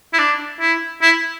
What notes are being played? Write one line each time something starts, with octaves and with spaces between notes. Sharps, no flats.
E4
D4
E4
E4